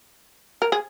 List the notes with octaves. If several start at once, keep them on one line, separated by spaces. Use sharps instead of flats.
A#4
G#4